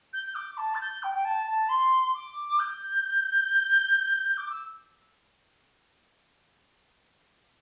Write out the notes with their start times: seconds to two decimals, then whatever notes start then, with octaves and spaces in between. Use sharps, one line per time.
0.13 G6
0.35 D6
0.57 A5
0.75 A6
0.81 G6
1.03 G5
1.14 G5
1.25 A5
1.47 A5
1.69 C6
2.14 D6
2.59 G6
4.37 D6
4.50 E6